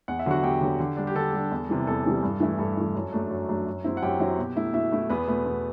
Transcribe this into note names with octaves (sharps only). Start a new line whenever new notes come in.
E2 F#5
E5
D3 F#3 F#4 F#5
E2 G4 G5
D3 F#3
D3
G3 D4
G4
D3 A4
G3 D4
E2
C3 E3 G3
E2 A4
C3 E3 G3
G2
E3 A3 E4
G2 A4
E3 A3 E4
F#2
F#3 A3 D4
F#2
F#3 A3 D4
F#2
F#3 C4 E4
F#5
F#2 G4 G5
F#3 C4 E4
B2
A3 E4
B2 E4 E5
A3 E4
E2 B3 B4
B2 A3
E2